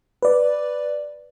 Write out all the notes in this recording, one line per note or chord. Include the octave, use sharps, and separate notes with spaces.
B4 D5